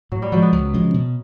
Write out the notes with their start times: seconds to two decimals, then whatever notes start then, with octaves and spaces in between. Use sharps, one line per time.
0.12 A2 F#3
0.22 G3
0.32 F3 F#3 G#3
0.42 B3
0.52 C#2
0.74 C#3 F3 G#3
0.94 B2